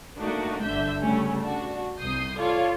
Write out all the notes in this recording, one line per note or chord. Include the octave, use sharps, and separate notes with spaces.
A3 A#3 D4 D#4 F#4
G1 D3 E5 G6
C#3 G3 A3 C#4
D4 F#4
C2 D#6 G6 C7
F4 A4 C#5 D5 F5